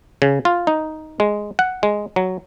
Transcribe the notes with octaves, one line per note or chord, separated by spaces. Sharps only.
C#3
F4
D#4
G#3
F#5
G#3
F#3